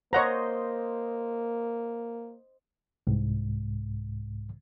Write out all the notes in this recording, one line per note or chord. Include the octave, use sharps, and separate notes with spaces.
A#3 C5 C#5 D#5 F#5 A#5
C2 G#2